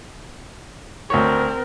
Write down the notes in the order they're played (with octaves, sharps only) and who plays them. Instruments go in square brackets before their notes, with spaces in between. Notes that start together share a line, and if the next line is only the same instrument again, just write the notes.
[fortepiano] D2 C#5 [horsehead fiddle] C4 A#4